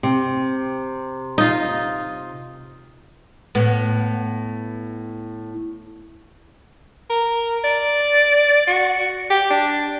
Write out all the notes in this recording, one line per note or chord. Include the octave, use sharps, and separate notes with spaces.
C3
D#4 F4
A2 B3
A#4
D5
F#4
G4
D4